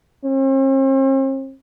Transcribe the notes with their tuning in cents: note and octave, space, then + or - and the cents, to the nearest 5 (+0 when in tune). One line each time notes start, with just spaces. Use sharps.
C4 +45